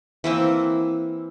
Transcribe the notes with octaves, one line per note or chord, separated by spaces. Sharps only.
E3 A#3 C4